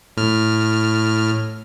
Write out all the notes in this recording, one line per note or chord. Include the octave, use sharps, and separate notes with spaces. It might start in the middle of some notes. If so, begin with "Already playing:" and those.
A2 F6